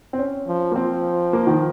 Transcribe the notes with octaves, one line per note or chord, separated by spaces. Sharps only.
C4
C#4
F3
A#3
F3 C4
A#3
D#3